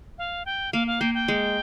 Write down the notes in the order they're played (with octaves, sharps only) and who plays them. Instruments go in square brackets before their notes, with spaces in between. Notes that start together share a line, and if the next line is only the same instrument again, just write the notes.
[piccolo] F5
G5
[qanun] A#3 [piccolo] F5
[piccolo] F5
[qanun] A#3 [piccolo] G5
[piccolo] G5
[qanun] G#3